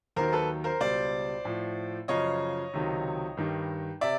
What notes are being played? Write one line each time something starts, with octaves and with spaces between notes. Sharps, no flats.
D#2 D#3 F#3 A#4 C5
A4 B4
A#4 C5
C#2 B2 G3 C5 D5
A2 F3
F#2 C#3 F3 C#5 D#5
C#2 C3 D#3 F#3
G2 D#3 G3
C3 D5 E5